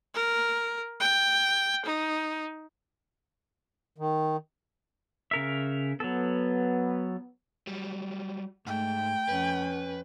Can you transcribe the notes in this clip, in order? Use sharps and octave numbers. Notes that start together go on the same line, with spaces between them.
A#4
G5
D#4
D#3
C#3 A#4 E5
F#3 B3 A4
F#3 G3
G#2 A3 G5
F2 C#4 B4